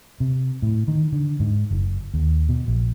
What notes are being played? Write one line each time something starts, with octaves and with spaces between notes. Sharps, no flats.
C3
A2
D#3
D3
G#2
F#1
D#2
B2
A#1